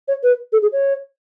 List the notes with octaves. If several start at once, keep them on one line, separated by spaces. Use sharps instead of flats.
C#5
B4
A4
G#4
C#5